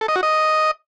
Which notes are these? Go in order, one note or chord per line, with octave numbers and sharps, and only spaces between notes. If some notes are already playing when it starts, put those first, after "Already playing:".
A4
D#5
F#4
D#5